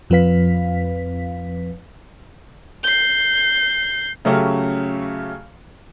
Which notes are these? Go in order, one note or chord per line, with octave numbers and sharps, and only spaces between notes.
F2 F3 C4 B4 F5 B6
G6 C7
C#3 F#3 A3 C#4 G4